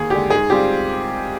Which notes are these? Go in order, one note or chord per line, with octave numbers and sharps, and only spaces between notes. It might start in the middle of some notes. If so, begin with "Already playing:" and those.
Already playing: D#2 G#4
D3 G#3 G4
G#2 G#4
G3 C4 F4 G4